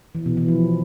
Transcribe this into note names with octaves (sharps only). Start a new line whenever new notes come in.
E3
B2
E3
F3